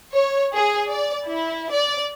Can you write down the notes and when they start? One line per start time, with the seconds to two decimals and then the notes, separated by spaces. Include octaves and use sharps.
0.14 C#5
0.53 G#4
0.90 D5
1.27 E4
1.71 D5